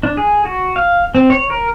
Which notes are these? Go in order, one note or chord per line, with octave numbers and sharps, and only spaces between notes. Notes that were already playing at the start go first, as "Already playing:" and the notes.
D4
G#4
F#4
F5
C4
C#5
A#4